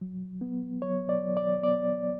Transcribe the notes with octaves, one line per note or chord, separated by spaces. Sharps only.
F#3
B3
F#3 C#5
D5
F#3
D5
B3 D5